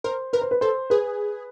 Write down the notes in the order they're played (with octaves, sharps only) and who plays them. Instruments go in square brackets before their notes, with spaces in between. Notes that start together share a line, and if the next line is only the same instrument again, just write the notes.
[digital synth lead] A#4 [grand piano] C5
[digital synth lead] A#4 [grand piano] B4
[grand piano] C5
B4
[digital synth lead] A4 [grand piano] C5
[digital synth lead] G#4 [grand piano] B4